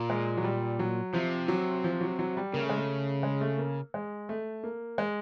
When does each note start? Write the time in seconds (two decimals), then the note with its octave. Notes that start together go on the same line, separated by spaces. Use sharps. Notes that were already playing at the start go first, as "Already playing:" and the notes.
Already playing: A#2
0.10 G#3
0.37 F#3
0.44 G3
0.79 F#3
1.13 C3 F3
1.48 F#3
1.84 F3
2.01 F#3
2.19 F#3
2.37 G3
2.53 C#3 A#3
2.62 A3
2.69 G#3
2.76 A3
3.23 G#3
3.41 A3
3.58 A#3
3.94 G#3
4.29 A3
4.64 A#3
4.98 G#3